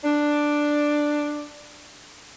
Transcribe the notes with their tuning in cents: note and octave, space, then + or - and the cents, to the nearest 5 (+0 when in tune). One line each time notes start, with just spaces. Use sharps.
D4 +5